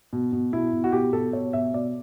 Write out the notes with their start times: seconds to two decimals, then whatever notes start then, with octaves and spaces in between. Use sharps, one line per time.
0.13 B2
0.33 B2
0.53 B2 E4
0.73 B2
0.84 F#4
0.92 B2 G4
1.13 B2 A4
1.33 B2 C#5
1.53 B2 E5
1.73 B2 D5